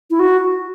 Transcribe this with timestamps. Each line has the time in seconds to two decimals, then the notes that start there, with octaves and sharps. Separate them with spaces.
0.10 E4
0.19 F#4